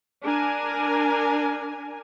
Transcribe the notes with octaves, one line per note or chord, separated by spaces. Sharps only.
D4 A#4 G#5